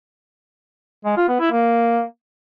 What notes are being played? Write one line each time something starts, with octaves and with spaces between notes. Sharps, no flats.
G#3
F4
B3
E4
A#3